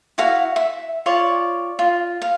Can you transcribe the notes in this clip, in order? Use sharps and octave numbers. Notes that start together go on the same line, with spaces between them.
E4 F#4 F5
E5
F4 C#5 D5
F4
F5